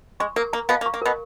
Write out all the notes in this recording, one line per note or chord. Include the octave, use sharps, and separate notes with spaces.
G#3 C#6
A#3 A#4
A#3 A#5
B2 B3 F5
A#3
C#6
A#3
B2 B3 A#4